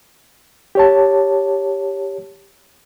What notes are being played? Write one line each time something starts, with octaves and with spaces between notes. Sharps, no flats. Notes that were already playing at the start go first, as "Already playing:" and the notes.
G4 C#5 A5